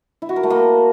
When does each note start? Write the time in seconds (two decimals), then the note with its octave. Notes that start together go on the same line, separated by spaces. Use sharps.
0.22 E4
0.29 F#4
0.36 A#4
0.43 A3
0.50 A#3